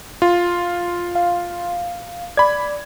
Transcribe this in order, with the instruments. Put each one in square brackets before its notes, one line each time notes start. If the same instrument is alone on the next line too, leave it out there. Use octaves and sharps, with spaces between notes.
[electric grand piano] F4
[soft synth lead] F5
[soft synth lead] D5 [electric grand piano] B5 G#6